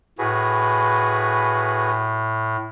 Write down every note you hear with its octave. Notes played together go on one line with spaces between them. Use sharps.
A2 F#4 G#4 B4